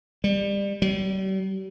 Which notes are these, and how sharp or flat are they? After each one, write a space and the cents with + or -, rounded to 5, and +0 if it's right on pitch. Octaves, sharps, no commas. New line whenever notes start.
G3 +25
G3 -40